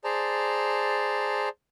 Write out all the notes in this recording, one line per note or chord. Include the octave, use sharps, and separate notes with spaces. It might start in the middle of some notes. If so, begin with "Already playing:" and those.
G#4 C5 D5 A5 A#5